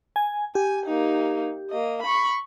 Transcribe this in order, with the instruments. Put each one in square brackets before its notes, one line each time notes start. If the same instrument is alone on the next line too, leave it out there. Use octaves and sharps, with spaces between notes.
[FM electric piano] G#5
[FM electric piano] G4 [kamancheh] G#5
[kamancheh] A#3 D#4
A#3 D#5
B5 C#6